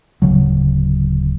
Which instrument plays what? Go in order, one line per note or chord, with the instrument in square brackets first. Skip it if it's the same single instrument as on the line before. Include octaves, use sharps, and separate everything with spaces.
[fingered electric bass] D1 G#1 C#3 F#3